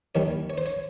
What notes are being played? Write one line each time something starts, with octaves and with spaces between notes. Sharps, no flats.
D#2 D#3 G3 C#5
C#5
C5
C#5